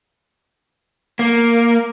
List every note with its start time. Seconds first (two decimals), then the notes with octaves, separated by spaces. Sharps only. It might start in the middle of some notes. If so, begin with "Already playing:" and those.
1.19 A#3